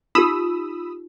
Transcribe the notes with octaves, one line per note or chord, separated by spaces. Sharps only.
D#4 F4 G4 B5 D#6 E6